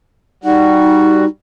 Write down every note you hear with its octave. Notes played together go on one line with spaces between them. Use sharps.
G3 D#4 F#4